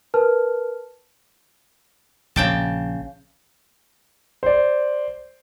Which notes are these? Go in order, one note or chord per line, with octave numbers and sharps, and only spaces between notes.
A#4 B4 A5 F6
A#1 C#3 G5 A5
C5 D5